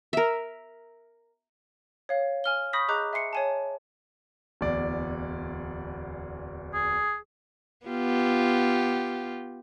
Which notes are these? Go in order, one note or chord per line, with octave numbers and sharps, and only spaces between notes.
A#4 E5
C#5 F5
G#5 F6 G7
B5 C#6 D#6 G6 A#6 B6
G#4 D#5 A#5 D6 F#6 G6
E5 G#5 C6 C7 C#7
C#5 G#5 A5
D1 E2 D5
G#4
B3 F4 G4